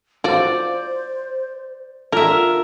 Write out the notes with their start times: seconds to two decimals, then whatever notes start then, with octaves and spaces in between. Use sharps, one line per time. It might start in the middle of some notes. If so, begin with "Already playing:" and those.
0.24 F4 F#4 C5 D5
2.12 D3 D4 F4 A#4 E5